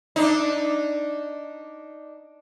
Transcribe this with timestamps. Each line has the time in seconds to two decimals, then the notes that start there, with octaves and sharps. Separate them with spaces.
0.16 D4 D#4